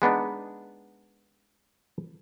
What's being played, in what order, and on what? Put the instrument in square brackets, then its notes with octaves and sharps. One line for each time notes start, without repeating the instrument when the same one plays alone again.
[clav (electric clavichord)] G#3 B3 D4 D#4